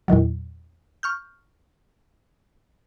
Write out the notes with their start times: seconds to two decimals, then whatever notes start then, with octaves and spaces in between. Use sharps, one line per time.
0.08 E2 A#2 D#3 F#3
1.03 C#6 F6 G6